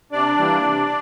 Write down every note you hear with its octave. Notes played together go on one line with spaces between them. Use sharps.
C3 D4 D5
E3 G3 A#3
C3